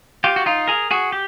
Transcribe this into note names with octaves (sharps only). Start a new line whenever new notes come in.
F4 G4
F#4
D#4 F4
G#4 A#4
F#4 G#4
G4